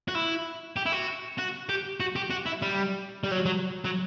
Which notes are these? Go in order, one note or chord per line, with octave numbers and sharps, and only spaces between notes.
F#4
E4
G4
E4
F#4
F#4
G4
F#4
G4
F#4
E4
G3
G3
F#3
F#3
F#3